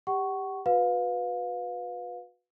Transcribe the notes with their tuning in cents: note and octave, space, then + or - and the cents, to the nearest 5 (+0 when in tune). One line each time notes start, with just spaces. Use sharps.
G4 +15 F#5 +35 C#6 +0
F#4 -30 B4 +0 F5 +25